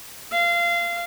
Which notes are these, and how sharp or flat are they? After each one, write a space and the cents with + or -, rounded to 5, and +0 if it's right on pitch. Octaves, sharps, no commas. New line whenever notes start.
F5 -20